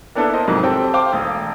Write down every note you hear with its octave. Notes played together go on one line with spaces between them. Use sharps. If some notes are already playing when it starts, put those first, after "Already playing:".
A#3 B3 D4 E4 A4 B4
A#4 C5 D#5
F2 G#2 C3 F#3
C4 G4 A4 G5 A5
C5 F5 G5 D6
E1 A3 D#6